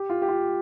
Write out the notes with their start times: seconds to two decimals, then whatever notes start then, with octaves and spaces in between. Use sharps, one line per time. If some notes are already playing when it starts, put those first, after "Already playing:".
Already playing: G4
0.10 F4
0.22 G4
0.28 F4